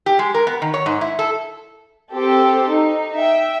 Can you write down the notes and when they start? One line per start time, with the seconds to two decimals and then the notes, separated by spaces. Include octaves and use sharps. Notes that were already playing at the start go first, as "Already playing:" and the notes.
0.06 G4
0.19 G#3
0.34 A#4
0.47 B3
0.62 D#3
0.74 C#5
0.86 G#2
1.01 E4
1.19 A4
2.13 C4 G4 A4 C5
2.68 D#4
3.17 E5 G5